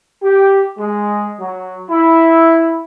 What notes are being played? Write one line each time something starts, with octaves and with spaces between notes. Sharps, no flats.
G4
G#3
F#3
E4